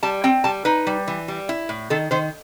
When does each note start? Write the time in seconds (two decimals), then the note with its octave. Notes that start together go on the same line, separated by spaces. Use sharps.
0.03 G3 A5
0.24 C4 G5
0.44 G3 A5
0.65 D#4 B4
0.87 G3
1.08 E3
1.28 G3
1.49 E4
1.69 A2
1.90 D#3 A4
2.11 D#3 C5